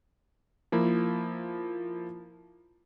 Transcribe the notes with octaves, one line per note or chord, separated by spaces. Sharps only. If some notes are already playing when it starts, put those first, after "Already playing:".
F3 A#3 E4